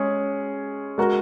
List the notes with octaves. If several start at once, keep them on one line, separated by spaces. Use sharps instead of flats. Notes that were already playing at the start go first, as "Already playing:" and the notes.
Already playing: G#3 C#4 G#4
G#3 F#4 A#4